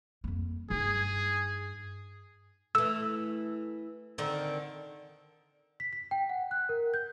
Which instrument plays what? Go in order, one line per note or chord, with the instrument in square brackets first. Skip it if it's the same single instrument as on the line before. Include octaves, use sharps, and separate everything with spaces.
[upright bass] F2 A#3
[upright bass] G2 D#4 [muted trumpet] G#4
[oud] E3 A3 [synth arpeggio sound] E6
[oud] D3 D#3 C4
[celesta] B6
B6
G5
F#5
F#6
A#4
G6